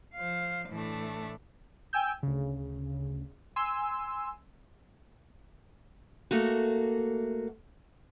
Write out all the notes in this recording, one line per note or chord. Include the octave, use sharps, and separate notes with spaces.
F3 C5 F5
A2 E3 A3 D4
G5 G#5 E6 G6
D2 C#3
G#5 C6 E6
A3 A#3 F#4